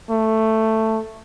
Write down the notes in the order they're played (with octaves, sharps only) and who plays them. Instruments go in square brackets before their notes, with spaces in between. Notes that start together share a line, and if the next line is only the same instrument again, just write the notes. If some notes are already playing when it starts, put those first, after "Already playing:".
[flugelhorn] A3